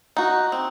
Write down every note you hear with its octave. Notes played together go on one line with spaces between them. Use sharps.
D#4 F#4
C4